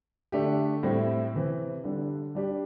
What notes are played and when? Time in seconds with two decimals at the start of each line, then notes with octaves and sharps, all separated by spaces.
0.32 D3 A3 D4 G4
0.83 A2 G3 C4 E4
1.34 C3 E3 C4
1.84 D3 G3 D4
2.35 G3 D4 G4